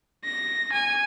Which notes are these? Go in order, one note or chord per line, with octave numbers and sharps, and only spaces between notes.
A#6
G#5